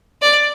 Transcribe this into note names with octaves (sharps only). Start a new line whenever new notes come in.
D5